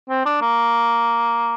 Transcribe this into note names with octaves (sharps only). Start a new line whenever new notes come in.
C4
D4
A#3